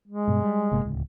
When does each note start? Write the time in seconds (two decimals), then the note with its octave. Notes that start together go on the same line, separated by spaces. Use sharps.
0.08 G#3
0.28 G2 B2
0.42 G3
0.71 G1 C3 A#3
0.85 D1 C#2